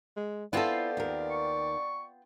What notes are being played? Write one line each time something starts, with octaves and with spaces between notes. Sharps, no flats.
G#3
B3 C4 E4 F4 A4 D5
D#2 A#4
C#6